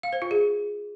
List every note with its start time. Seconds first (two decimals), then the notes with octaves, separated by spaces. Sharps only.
0.03 F5
0.13 C5
0.22 F4
0.31 G#4